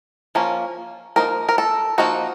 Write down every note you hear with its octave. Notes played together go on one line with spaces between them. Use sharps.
F3 A#3 C#4
F3 A#3 D#4 A#4
A#4
A4
F3 A#3 D#4 F#4